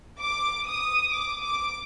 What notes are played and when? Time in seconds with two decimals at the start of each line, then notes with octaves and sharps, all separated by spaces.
0.20 D6
0.67 D#6
1.12 D6
1.43 D6